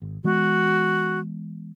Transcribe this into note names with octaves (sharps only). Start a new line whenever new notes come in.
G#1
E3 G#3 B3 F#4